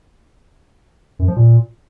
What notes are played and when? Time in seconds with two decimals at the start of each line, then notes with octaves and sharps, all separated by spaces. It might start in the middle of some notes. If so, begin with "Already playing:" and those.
1.19 F#2
1.28 F3
1.36 A#2